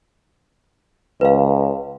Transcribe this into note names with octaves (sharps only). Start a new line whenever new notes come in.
C#2 B4 F5